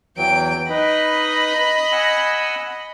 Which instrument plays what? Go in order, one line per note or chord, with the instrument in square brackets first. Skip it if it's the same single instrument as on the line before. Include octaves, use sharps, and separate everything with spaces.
[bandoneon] E2 E3 F#3 [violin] G5 D7
[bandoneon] D#4 B4 [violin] D#5 B5
[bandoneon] F#5 G#5 E6